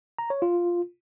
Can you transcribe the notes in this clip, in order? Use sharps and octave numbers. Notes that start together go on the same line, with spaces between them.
A#5
C#5
F4